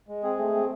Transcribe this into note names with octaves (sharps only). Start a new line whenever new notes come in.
G#3
C4 G#4
A3
C4